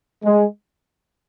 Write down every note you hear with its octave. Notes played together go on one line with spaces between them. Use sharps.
G#3